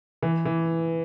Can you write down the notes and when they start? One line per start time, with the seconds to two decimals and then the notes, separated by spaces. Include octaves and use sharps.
0.22 E3
0.45 E3